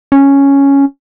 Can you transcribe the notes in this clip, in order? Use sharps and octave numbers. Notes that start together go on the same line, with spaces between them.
C#4